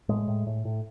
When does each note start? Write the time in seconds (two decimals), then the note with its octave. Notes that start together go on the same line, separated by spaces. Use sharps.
0.09 A2 G#3
0.28 A2
0.47 A2
0.65 A2